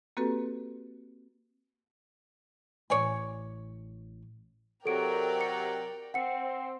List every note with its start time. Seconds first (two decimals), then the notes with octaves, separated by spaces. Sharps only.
0.17 A#3 C4 F#4 G4 A4 B4
2.90 A1 C#5 D5 G#5
4.85 C3 F#3 A4 A#4 D5 G5 D7
5.41 C#7
6.14 C4 F#5 C#7